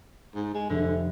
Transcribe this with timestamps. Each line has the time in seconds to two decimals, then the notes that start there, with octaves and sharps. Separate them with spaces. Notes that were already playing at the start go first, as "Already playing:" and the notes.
0.35 G#2
0.54 G#3
0.70 F1 D3